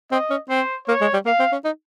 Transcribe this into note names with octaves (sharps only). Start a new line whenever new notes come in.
C4 D#5
C#4
C4 C5
A#3 C#5
G#3
G3
A#3 F5
C4
C#4
D#4